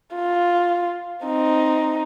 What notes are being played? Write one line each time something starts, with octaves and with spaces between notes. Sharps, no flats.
F4
C4 D#4